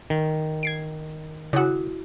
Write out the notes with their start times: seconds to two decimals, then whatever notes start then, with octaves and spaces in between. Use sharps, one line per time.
0.10 D#3
0.63 G#6 C7 D7
1.53 C#3 E4 F#4 F#5